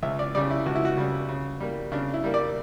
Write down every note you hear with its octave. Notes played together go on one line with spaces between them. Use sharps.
C#2 E5
D5
C#3 G3 D5
E4
C#2 F#4
E4
F#4
C#3 G3
C#3
G3 A#3
C#3 D4
E4
G3 A#3
D5